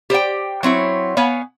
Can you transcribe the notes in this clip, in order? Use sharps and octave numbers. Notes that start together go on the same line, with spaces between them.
G4 C5 D5 G5
F#3 C4 E4 C#5
B3 C#5 F5 G#5